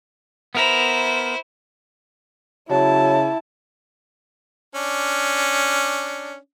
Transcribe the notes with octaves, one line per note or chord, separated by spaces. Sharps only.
B3 E4 A#4 C5 A#5
C#3 F#3 E4 A5
C#4 D4